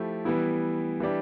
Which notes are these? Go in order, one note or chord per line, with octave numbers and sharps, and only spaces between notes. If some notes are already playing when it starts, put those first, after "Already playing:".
Already playing: F3 A3 E4 G4
E3 G3 B3 E4
E3 G3 D4 G4